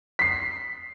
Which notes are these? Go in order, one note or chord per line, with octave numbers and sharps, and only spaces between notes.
B6 C7